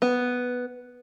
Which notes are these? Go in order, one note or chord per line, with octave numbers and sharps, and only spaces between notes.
B3